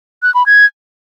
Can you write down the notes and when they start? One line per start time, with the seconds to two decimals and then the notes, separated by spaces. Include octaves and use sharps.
0.23 F#6
0.34 B5
0.46 G#6